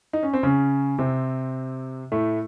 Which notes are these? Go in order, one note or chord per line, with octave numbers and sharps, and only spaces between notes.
D#4
C#4
C4
C#3 C#4
C3 C4
A2 A3